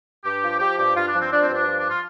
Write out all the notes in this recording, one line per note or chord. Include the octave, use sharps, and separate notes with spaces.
G2 G4
F3
F3 G4
G2 G4
G2 F4
D4
F3
C4
F3 D4
C4
G2
D4
F3
D4
F4